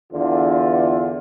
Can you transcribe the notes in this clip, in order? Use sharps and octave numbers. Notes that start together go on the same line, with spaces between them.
E2 D3 F4